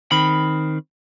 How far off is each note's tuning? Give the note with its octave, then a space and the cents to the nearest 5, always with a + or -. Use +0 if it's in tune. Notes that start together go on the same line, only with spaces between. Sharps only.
D#3 +0 C4 +0 B5 +0